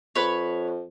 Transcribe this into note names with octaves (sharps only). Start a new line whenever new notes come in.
F2 B4 C#5